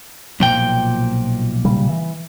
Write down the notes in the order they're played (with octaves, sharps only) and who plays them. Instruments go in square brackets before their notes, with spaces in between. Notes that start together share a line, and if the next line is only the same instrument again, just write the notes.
[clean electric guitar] B1 A#2 G5 [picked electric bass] F3
[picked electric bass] C#3 G3
E3